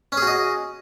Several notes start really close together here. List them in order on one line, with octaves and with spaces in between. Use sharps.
C#4 G#4 F#4 D#5